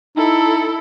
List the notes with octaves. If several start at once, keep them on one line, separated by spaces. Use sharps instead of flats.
D#4 E4 A4